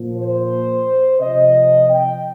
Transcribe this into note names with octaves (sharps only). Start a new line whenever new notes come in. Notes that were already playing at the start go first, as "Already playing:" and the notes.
Already playing: A#2 F3
C5
C3 F3 D#5
G5